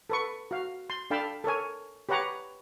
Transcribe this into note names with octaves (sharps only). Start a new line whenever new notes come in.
A4 B4 C#6
F#4 F5
C6
D4 A4 F5 G5 A5 B5
A4 A#4 C#5 G#5
G4 B4 C#5 F#5 A#5 D6